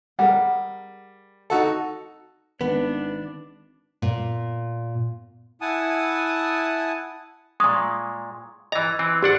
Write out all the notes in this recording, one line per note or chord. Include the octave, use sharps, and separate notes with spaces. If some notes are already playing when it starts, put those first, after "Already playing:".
G3 G#4 A#4 F#5
D#4 F#4 A4
G#1 D#3 B3 D4
A#2
E4 F#5 G#5 A5 D#6
A#2 G#3 C#6 D#6
E3 D#5 A#5
E3 C4
G#1 D4 G4 F#5